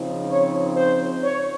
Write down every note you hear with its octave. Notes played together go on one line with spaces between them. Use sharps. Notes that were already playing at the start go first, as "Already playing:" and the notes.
Already playing: C#3 F3 C4 D#4
C#5
C5
C#5